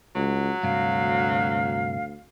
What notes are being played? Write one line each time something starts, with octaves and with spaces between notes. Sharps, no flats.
C#2 F#3
D2 G2 C3 F5